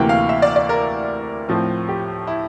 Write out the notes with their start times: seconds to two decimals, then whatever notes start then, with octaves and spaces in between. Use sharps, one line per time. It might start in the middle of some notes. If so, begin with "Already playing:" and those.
Already playing: D2 C3 E3 A#3 G5
0.09 F5
0.29 E5
0.42 D5
0.56 D5
0.69 A#4
1.49 A2 F3 C4
1.88 G4
2.27 E4